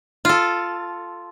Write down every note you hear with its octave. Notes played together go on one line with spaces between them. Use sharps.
F4 A4